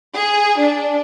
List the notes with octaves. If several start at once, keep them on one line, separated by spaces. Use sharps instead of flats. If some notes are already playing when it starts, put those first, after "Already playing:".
G#4
D4